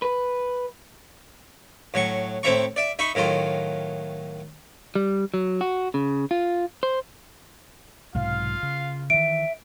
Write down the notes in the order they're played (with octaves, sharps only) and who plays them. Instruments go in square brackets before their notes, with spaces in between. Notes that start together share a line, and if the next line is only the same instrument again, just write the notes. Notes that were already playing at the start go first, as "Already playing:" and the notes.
[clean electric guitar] B4
[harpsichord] A2 F#3 C#6
A2 C4 E4 E5 A#5 C#6
D5 E5
D#4 E5 B5 C#6
A2 D#3 F#3 F4
[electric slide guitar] G3
F#3
F#4
C#3
F4
C5
[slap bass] B1 G#2 C3 [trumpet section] F4 F5
[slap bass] C#3
[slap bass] D#3 E3 [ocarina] E5 [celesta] D7